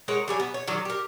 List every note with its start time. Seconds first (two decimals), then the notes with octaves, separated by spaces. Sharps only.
0.08 G#3 A#4 C#5 F#5
0.28 F#3 G3 G#5
0.40 B3
0.54 C#5
0.67 D#3 F#3 D5
0.85 G4 A#4